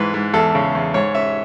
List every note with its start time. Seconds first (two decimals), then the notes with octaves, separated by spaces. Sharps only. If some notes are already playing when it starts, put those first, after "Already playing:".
Already playing: G#2 E3 B4
0.14 G#2
0.34 E2 A4
0.55 C#3
0.75 E2
0.94 G#2 C#5
1.15 C#4 E5